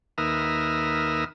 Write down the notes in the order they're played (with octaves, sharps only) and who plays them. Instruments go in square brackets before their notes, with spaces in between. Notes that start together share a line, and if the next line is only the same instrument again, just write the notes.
[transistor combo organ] D#2 A#4 B4 E5 D#6 F6